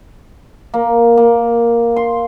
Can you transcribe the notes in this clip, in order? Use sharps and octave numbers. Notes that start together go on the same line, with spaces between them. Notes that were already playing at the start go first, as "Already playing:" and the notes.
A#3
A#3
C6